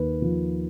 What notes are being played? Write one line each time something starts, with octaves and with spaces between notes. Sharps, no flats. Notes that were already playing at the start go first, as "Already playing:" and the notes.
Already playing: D#2 B4
F3